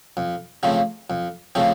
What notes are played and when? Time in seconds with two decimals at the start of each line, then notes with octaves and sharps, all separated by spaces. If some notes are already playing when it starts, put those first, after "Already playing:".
0.17 F2
0.63 C#3 F3 A3 C4
1.10 F2
1.55 C#3 F3 A3 C4